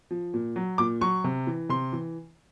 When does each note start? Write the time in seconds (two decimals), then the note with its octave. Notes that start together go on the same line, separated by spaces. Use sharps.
0.11 F3
0.34 A#2
0.56 F#3
0.78 A#2 D6
1.01 F#3 C#6
1.24 C3
1.47 E3
1.69 C3 C6
1.93 E3